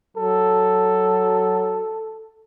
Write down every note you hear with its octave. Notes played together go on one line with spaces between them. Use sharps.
F#3 A4